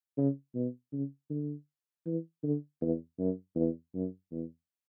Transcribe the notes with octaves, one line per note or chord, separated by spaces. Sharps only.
C#3
B2
C#3
D3
E3
D3
E2
F#2
E2
F#2
E2